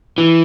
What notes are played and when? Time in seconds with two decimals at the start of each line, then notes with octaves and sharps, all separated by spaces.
0.18 E3